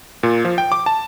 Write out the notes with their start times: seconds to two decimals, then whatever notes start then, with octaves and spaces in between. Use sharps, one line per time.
0.23 A#2
0.45 F3
0.58 G5
0.72 D6
0.86 A5